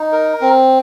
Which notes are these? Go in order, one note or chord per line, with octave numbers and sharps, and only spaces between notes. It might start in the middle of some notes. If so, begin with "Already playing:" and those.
Already playing: D#4
A#4
C4